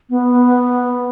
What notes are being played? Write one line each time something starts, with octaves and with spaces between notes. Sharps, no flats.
B3